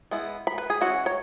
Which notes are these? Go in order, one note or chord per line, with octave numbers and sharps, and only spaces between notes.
G#3 B3 E4
B5
B4
G#4
E3 G#3 C#4 E4 F#4
C#5